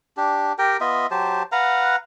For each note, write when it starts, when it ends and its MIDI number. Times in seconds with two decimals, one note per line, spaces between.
0.17 0.53 62
0.17 0.53 67
0.58 0.77 67
0.58 0.77 70
0.58 0.77 79
0.81 1.07 59
0.81 1.07 65
0.81 1.07 75
0.81 1.07 76
1.11 1.43 54
1.11 1.43 67
1.11 1.43 72
1.11 1.43 81
1.52 1.96 71
1.52 1.96 77
1.52 1.96 78
1.52 1.96 82